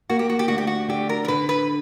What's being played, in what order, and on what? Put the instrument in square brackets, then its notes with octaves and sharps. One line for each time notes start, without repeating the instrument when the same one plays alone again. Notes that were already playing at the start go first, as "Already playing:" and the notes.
[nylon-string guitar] A#3 [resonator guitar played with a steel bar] F#4
[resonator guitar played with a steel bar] G4
F#4
G4
[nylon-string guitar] D2 [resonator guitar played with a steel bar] F#4
[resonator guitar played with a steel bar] G4
F#4
[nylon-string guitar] D3 [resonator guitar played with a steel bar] G4
[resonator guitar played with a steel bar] A#4
A#4
[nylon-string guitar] D3 [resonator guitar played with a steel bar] B4
[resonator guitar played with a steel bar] B4